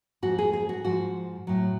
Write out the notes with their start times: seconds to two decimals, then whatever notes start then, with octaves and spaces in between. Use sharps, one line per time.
0.22 G#2 F3 F#4
0.39 G#4
0.53 G#4
0.69 F#4
0.85 G#2 F3 F#4
1.47 A2 F#3